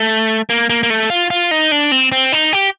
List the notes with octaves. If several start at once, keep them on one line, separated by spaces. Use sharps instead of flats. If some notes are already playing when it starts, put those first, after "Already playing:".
Already playing: A3
A#3
A#3
A#3
A3
F4
F4
D#4
D4
C4
C4
D#4
G4